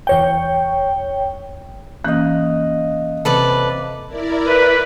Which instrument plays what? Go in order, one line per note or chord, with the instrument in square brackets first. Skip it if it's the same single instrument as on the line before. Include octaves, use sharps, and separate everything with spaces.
[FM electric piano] E2 C#5 G5
[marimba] E3 A#3 C#4 [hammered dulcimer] D#5 F5 [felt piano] F#6
[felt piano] C3 [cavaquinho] A4 B4 D5
[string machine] E4 A#4 D5
[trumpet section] B4